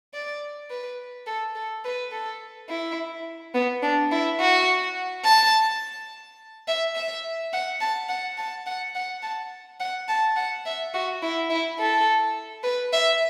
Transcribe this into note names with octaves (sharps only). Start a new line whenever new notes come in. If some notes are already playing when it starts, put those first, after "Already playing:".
D5
B4
A4
A4
B4
A4
E4
B3
D4
E4
F#4
A5
E5
E5
F#5
A5
F#5
A5
F#5
F#5
A5
F#5
A5
F#5
E5
F#4
E4
E4
A4
B4
E5